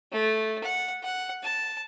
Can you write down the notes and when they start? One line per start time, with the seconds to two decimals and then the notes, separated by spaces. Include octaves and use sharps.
0.12 A3
0.63 F#5
1.03 F#5
1.43 A5